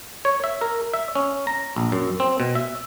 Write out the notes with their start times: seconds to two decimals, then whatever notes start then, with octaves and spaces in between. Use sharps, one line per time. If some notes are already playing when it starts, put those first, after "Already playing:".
0.25 C#5
0.44 E5
0.61 A#4
0.94 E5
1.15 C#4
1.47 A#5
1.76 A#1
1.92 F#2
2.20 C4
2.40 B2
2.55 E5